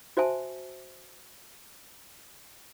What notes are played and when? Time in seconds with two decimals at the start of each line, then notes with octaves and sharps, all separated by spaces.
0.17 F#4 C5 E5 G#5 A5